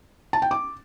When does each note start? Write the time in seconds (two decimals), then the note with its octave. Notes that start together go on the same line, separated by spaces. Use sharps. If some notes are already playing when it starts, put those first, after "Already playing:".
0.33 A5
0.42 G5
0.51 D6